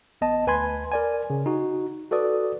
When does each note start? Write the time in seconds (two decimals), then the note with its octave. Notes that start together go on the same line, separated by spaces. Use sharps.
0.21 A1 B3 D#5 A5
0.47 D2 B4 G#5 B5 C6 G#6
0.92 A#4 D5 G#5
1.30 C#3
1.46 D#4 F#4
2.11 F#4 A4 B4 D5 D#6